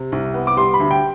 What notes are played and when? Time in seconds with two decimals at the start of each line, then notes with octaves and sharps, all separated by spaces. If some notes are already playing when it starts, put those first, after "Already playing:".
Already playing: C3
0.12 C2
0.34 B3
0.47 D6
0.57 G3 C6
0.74 B5
0.80 D2
0.91 G5